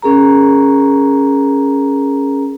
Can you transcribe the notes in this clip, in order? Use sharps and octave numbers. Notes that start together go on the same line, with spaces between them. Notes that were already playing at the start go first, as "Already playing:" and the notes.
C#4 G#4 A#4 A#5